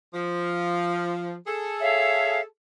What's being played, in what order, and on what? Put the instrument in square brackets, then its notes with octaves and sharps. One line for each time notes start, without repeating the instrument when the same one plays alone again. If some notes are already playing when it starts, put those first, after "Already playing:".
[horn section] F3
G#4 A4
[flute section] C#5 E5 F5